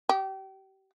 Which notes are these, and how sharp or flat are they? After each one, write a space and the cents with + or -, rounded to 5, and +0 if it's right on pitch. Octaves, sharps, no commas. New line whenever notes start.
G4 -30